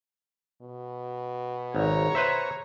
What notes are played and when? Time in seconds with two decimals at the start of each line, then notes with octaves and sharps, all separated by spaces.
0.62 B2
1.75 G#1 C#5 A#5
2.15 B4 C5 E5